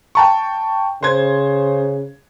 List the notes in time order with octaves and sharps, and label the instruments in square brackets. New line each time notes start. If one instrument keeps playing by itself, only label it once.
[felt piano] G5 A5 C#6
[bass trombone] C#3 [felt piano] C5 G#6